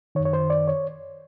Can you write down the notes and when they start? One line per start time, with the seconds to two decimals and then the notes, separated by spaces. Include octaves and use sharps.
0.15 D#3 C#5
0.20 F#2
0.25 C#5
0.33 C5
0.50 D5
0.68 C#5